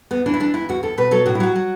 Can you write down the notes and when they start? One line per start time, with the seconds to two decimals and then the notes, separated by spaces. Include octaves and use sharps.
0.11 E2 B3
0.26 E3 D4
0.34 E4
0.40 E3 D4
0.54 E2 E4
0.69 E2 F#4
0.83 E2 A4
0.98 B2 B4
1.11 F#3 A4
1.26 A2 F#4
1.35 E4
1.40 F#3 F#4
1.56 F#3